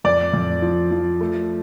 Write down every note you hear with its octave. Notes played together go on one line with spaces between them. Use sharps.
F2 D5
F2
F3
F3
A3